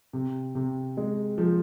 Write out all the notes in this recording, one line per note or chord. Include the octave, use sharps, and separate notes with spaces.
C3
C3
G#3
F3